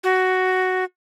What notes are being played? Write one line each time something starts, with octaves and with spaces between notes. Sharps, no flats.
F#4